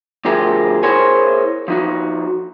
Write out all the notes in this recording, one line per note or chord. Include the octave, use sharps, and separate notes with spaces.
D2 F3 G4 G#4 A#4
E4 G#4 A#4 C5 C#5 G#5
F3 D#4 F#4